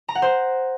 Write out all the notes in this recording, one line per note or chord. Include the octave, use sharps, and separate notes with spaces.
A#5
F#5
C5